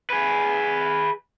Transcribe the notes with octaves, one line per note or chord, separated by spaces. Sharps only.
G#4 B4